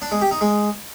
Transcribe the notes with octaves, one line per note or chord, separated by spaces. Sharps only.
D4
G#3
G4
D#4
G#3